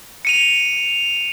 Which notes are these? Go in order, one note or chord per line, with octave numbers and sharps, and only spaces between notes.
C#7 D#7 F7